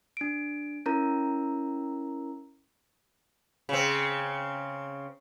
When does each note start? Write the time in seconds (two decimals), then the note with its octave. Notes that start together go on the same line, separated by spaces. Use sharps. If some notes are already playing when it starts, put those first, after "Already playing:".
0.17 D4 D7
0.86 C#4 E4 A#4 A#5
3.69 C#3 C4